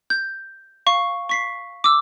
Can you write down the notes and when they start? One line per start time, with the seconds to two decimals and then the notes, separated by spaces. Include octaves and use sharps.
0.10 G6
0.86 F5 C#6
1.29 C#6 B6 C7
1.84 D6 E6